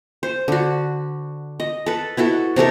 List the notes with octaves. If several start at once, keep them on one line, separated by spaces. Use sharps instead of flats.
C5
D3 F#4
D#5
A4 B4
B3 E4 F#4 A4
C3 D#4 A4 A#4